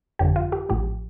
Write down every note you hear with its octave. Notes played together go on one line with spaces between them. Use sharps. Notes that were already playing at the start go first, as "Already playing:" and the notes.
G1 F2 D3 F3 G4
F4
G4
A1 A2 F3 G4